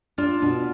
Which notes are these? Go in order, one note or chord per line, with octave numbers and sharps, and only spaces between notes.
D4 F4
B2